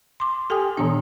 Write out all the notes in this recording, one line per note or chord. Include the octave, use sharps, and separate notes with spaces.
C6 D6
G4 A4 G5 G#5 D#6
A#2 D#3 E3 B3 D4